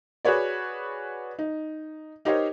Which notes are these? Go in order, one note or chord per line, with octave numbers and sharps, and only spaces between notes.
F#4 G#4 B4 C#5 D5
D#4
D#4 G4 A#4 C5 C#5 D#5